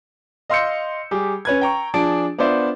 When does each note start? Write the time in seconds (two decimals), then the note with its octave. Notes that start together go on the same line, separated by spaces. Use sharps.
0.50 D#5 F5 C6 E6 G6 C#7
1.11 G3 G4 G#4
1.45 C#4 B4 G#6
1.61 G5 A#5 C#6
1.94 F3 D4 G#4 G#5 A5 D7
2.38 B3 D4 F4 C5 D5 E5